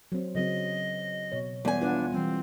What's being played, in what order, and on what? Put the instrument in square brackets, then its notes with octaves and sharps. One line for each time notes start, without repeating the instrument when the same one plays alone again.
[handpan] F#3 C4
[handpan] C#3 F#3 C4 [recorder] D#5
[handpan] B2 C#5
[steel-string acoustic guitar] E2 G#5 [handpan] G3 G#3
[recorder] D4 [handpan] F4 B4 F#5
[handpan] E3 G3 [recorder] C4